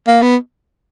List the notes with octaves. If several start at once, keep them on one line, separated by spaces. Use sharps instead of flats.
A#3
B3